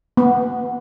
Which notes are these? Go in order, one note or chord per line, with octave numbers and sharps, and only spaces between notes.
B3